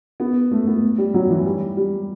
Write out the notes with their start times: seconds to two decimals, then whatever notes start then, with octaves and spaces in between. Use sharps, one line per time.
0.20 B3
0.51 A3
0.67 B3
0.98 G3
1.14 F#3
1.30 E3
1.46 G3
1.77 G3